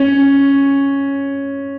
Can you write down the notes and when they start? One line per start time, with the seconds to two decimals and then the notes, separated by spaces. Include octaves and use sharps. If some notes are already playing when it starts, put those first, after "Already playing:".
Already playing: C#4